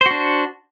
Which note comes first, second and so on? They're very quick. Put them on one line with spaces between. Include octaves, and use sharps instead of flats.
C5 F#4 D4